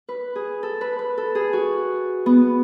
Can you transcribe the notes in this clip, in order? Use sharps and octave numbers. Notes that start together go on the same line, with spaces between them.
B4
G#4
A4
B4
B4
A4
G#4
F#4
B3